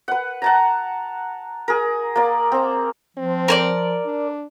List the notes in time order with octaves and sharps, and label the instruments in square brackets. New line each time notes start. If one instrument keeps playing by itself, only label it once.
[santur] B4 F#5
F#5 A5 A#5
G#4 A#4
A#3 D5
C4 A#5
[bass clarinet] F3 [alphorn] C4
[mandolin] A#4 C5 D5
[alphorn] D4